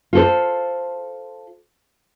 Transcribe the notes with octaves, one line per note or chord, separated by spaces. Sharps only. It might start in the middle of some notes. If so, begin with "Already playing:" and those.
F4 A4 C5